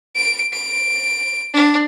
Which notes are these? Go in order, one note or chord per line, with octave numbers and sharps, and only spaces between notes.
D7
D7
D4